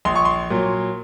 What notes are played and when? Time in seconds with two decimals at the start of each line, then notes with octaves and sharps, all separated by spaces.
0.05 A#1 C6
0.15 C#6
0.25 C6
0.50 A#2 F#3